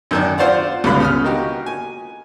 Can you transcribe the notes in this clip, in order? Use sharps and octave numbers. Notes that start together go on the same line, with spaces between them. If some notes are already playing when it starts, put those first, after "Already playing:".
F#2 D#3 D4
F4 C5 D5 F5 F#5
C#2 G2 B2 D3 F5 B5
C#3 D#6 F6
A#3 D#4 F#4 G4
G#5